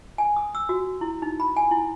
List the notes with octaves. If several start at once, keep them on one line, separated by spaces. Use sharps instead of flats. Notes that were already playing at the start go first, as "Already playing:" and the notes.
G#5
D#6
E6
F#4
E4
D#4
B5
G#5
E4